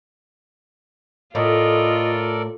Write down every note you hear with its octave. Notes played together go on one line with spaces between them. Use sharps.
A2 F4 A4 A#4 D5 D#5